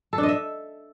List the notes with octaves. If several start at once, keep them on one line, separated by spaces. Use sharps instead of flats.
A4
D4
D#5
E5